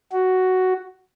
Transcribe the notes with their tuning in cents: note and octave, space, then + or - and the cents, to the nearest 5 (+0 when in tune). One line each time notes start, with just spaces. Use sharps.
F#4 +5